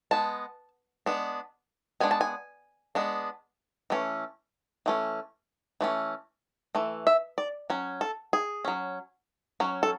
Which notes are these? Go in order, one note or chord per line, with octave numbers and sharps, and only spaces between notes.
G#3 B3 A5
G#3 B3 D4
G#3 B3 D4 G#5
A5
G#5
G#3 B3 D4
E3 A3 C#4
E3 A3 C#4
E3 A3 C#4
E3 A3
E5
D5
F#3 C#4
A4
G#4
F#3 C#4
F#3 C#4
A4